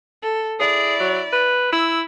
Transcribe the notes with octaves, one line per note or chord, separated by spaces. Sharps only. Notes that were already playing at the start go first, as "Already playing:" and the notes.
A4
E4 G#4 D5
F#3
B4
E4 E6